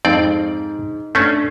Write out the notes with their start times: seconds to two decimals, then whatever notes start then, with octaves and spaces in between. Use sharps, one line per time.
0.05 F2 G#2 C4 D5
1.15 A3 C#4 D4 C7